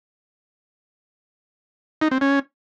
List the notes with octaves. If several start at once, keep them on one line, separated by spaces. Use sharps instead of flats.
D#4
C4
C#4